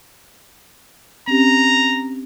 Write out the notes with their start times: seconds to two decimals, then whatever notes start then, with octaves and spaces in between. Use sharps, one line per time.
1.28 C4 C#4 G4 A#5